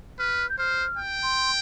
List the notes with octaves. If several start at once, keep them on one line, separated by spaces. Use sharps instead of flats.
B4 F6
G6
C5 F6
G5
C6